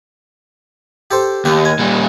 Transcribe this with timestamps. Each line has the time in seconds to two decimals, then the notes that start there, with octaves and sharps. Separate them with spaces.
1.11 G4 A4 C5
1.45 D#2 G4
1.65 G#5
1.79 A#2 G3